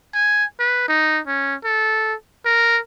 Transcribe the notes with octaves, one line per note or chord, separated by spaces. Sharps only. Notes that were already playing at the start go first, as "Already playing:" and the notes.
G#5
B4
D#4
C#4
A4
A#4